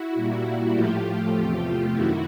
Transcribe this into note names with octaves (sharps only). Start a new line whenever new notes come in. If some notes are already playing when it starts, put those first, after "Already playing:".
Already playing: E4 F#4
A#2 G3 A#3
A2 F3 A3 F4 G4
E2 C3 F3 A3
F#2 D#3 E4 F#4